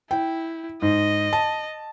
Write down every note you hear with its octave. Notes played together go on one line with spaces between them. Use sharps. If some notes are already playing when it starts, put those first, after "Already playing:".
E4 G5
G#2 D#5
A5